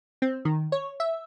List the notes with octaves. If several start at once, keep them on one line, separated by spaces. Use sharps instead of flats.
C4
D#3
C#5
E5